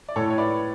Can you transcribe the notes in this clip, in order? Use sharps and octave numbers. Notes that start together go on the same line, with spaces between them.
D5
A2 A4 C#5
C#5
B4 D5